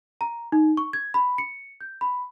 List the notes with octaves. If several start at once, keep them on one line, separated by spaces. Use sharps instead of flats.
A#5
D#4
C#6
G#6
B5
C#7
G6
B5